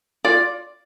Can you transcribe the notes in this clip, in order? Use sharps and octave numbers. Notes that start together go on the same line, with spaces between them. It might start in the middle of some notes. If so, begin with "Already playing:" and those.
F4 D5